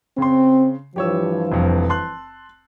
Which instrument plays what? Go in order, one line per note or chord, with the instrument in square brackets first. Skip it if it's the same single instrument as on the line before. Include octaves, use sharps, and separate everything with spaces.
[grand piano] C#3 C6 [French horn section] C4
[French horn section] G2 E3 F3 [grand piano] G4 C#5 E6
[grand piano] F1 F2
A5 C6 F#6